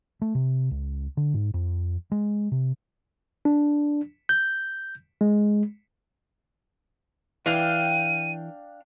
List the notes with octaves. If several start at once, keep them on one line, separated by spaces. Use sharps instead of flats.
A3
C3
C#2
D3
G#2
F2
G#3
C3
D4
G6
G#3
E3 D4 F5 G5 D#7